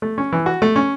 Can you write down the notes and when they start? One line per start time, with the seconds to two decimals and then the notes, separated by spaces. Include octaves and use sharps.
0.02 A3
0.18 C#4
0.33 E3
0.46 F#4
0.62 A3
0.76 C#4